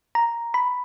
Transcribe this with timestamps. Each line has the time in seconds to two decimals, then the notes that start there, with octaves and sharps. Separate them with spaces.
0.15 A#5
0.54 B5